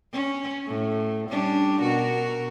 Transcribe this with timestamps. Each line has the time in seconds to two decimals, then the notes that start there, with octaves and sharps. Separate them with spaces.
0.13 C#4
0.68 A2
1.29 G3 C#4 D4
1.81 B2 F#4 A#4